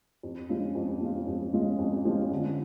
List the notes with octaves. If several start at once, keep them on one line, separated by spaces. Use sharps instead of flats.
F2
F3 G#3 C#4 F4
F2
F3 G#3 C#4 F4
F2
F3 G#3 C#4 F4
F2
F3 G#3 C#4 F4
D3